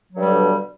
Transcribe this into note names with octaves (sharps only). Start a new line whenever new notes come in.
G2 B2 D3 F#3 G3